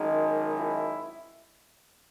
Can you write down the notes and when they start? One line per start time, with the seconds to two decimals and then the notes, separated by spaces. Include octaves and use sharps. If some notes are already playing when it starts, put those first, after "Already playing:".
Already playing: G#1 F#2 D#3 G#3 D#4
0.57 E4